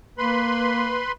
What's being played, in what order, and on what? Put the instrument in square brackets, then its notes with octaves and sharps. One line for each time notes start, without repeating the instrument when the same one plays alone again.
[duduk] A#3 [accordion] B4 B5 C6